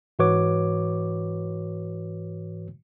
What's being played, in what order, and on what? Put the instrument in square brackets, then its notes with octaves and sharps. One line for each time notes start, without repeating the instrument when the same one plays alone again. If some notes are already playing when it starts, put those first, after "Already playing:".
[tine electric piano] G#2 E3 F#4 B4 C#5 D6